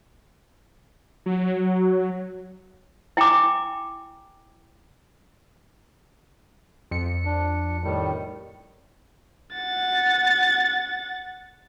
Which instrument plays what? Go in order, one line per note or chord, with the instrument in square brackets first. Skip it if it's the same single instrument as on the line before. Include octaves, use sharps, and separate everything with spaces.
[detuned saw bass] F#3
[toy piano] E4 G5 G#5 A#5 D6
[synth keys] F2 C#7
[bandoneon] D4
A2 D#3 G3
[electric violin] F#5 A6